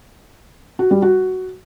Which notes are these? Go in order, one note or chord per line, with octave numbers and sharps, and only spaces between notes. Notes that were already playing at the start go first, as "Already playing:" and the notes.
F#4
G3
F#4